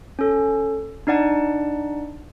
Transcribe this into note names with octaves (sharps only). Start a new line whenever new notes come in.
C#4 A4
D4 D#4 D5 F#5 A5